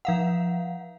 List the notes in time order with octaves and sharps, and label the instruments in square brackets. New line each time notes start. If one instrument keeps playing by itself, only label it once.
[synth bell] F3 F5 F#5